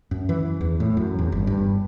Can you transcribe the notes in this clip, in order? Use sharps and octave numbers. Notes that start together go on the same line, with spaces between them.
F#2
E3
E2
A2
F#2
E2
G1
G2